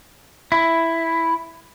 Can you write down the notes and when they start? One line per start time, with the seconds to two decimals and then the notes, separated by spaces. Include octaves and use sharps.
0.52 E4